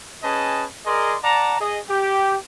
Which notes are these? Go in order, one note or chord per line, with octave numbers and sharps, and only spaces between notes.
C#4 G#4 B4 D#5 A5
G#4 A#4 D5 D#5 C6
D5 F#5 A5 A#5
G#4 D#5
G4